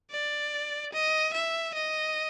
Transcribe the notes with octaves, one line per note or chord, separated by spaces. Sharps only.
D5
D#5
E5
D#5